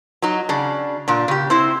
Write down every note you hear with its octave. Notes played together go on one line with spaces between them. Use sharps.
F#3 D#4
C#3 D4
A#2 D4
C#3 G4
C4 E4 C5